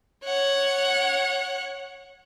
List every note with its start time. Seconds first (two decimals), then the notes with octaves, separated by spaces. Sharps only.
0.24 C#5 F#5